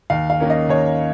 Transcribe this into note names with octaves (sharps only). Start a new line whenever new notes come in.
D#2 F5
F5
D#3 A#3 C#4
D#5
D#2 C#5